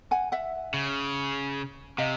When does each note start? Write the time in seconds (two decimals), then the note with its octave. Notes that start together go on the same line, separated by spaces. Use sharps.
0.11 F#5 G#5
0.32 E5 F#5
0.74 C#3
1.98 C3 D#5 F5